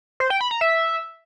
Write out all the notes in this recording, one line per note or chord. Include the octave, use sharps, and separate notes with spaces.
C5
G5
B5
A#5
E5